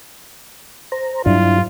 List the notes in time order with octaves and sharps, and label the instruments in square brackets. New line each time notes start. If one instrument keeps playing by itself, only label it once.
[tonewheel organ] C5 A#5
[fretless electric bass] G2 F#3 G3 [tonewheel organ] D4 E4 [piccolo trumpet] F4